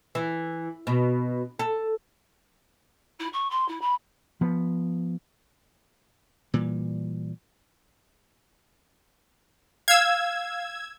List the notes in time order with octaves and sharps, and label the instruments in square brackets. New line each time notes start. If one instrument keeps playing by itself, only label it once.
[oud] E3
B2
A4
[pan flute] E4
C#6
C6
E4
B5
[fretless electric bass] F3 B3
[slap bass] A#2 E3 G3
[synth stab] F5 [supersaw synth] E6 G#6